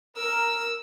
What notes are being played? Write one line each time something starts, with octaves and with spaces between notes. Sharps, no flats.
A#4 E6